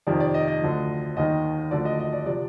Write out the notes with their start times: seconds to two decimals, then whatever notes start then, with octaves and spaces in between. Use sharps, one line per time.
0.07 F2 C3 D#3 D5
0.20 D5
0.34 D#5
0.48 D#5
0.61 D2 D3 F3
1.17 D#2 D#3 D#5
1.71 D2 D3 F3 D5
1.85 D#5
2.00 D#5
2.13 D5
2.26 C3 F3 D5